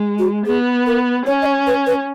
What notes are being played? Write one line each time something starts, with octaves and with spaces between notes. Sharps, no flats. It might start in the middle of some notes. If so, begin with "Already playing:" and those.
Already playing: G#3
F#4
B3 G#4
A#4
C#4 C#5
D#5
C#5
B4
B4